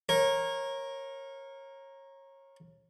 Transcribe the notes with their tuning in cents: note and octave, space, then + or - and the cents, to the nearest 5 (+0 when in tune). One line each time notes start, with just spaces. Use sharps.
A#4 +5 C#5 -25